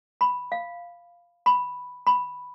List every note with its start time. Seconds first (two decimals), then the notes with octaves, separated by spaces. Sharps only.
0.21 B5
0.52 F5
1.46 B5
2.07 B5